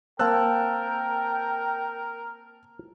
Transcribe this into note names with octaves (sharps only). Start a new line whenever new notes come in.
A#3 C4 A#4 G5 A5 E6 F#6